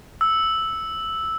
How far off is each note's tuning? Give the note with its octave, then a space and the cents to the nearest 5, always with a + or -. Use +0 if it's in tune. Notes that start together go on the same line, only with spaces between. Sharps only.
E6 -5